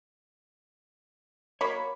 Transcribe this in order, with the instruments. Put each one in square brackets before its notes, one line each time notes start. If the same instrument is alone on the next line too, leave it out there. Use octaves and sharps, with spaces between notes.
[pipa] F#3 A#3 B5 [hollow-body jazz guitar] C#5